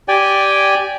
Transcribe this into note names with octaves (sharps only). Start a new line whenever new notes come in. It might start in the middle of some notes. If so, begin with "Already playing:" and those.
G4 D5 G5 G#5